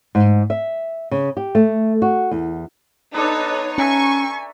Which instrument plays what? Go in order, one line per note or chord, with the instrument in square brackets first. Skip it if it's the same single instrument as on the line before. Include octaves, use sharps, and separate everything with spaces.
[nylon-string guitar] G#2
E5
C#3
G4
A3
F#4
E2
[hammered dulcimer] B3 D4 [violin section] D#4 C#5 [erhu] A4
[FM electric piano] C#4 [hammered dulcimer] A4 E5 A#5 [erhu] G#5 [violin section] C#6